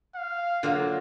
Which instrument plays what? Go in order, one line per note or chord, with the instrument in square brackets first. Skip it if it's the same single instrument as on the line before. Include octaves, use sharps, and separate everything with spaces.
[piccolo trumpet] F5
[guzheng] D3 [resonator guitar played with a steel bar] F#3 A#3 F4